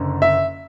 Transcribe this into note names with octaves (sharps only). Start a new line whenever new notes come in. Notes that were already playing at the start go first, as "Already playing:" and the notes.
Already playing: F#1 F#2 D3
E5